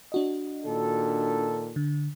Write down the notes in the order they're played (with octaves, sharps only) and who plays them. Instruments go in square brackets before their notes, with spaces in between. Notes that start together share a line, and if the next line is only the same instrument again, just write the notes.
[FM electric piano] D4 F#4 D#5
[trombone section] A#2 D#3 A4
[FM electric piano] D3